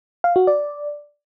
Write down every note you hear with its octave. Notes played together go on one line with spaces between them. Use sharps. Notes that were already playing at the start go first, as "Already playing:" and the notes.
F5
F#4
D5